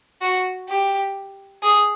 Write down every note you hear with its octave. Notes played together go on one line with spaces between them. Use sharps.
F#4
G4
G#4